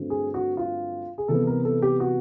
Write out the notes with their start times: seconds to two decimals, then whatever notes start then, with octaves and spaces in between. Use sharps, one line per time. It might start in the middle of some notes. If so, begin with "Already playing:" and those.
Already playing: G2 D3 F#3 A3 C4
0.10 G#4
0.34 F#4
0.57 F4
1.18 G#4
1.28 C3 E3 G3 B3 A4
1.47 A#4
1.65 A4
1.82 G4
2.00 F#4